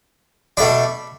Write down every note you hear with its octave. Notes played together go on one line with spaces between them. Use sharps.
B2 A3 D4 B5